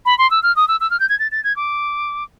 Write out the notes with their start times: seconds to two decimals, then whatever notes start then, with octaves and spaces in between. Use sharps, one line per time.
0.06 B5
0.18 C6
0.31 E6
0.43 F6
0.56 D#6
0.68 E6
0.81 E6
0.91 F6
1.00 G6
1.09 G#6
1.19 A6
1.32 A6
1.44 G#6
1.56 D6